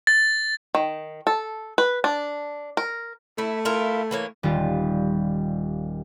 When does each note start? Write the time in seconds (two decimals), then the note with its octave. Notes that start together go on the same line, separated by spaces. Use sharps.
0.07 A6
0.75 D#3
1.27 A4
1.78 B4
2.04 D4
2.77 A#4
3.38 A3 E4
3.65 E4 F4 A#4
4.11 E3 A#3 C#5
4.43 D#1 G3 F4